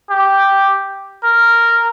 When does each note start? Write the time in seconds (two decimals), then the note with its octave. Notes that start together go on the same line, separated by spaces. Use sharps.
0.10 G4
1.24 A#4